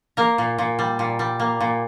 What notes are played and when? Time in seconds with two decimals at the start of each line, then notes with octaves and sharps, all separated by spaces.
0.17 A#3 A#4
0.38 A#2
0.58 A#2
0.79 G3
0.99 A#2
1.19 G3
1.40 A#3
1.61 A#2